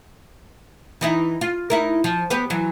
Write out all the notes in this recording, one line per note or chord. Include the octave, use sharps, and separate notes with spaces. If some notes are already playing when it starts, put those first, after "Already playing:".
E3 D#4 E4
F4
D#4 E4 A#4
F3
B3 G4 B4
E3 F#3